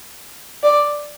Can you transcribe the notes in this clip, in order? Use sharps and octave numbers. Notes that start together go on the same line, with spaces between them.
D5